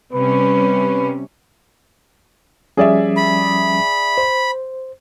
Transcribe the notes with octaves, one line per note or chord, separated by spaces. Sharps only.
C3 G3 C#4 B4
F3 G3 C#4 G#4 D5 E5
B5
C5